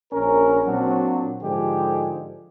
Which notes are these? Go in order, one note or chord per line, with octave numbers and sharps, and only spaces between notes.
A#1 C#4 A#4
A#2 F#3 C4 D4 F#4
G#2 D3 F3 G#3 G4